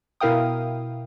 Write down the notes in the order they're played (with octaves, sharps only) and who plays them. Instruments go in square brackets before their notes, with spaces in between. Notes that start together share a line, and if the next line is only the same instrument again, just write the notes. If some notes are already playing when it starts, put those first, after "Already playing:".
[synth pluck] B2 E4 A#4 F5 G5 D#6